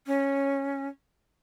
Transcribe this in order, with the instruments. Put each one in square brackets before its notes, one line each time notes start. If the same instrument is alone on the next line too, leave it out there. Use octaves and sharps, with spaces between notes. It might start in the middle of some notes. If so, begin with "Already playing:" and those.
[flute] C#4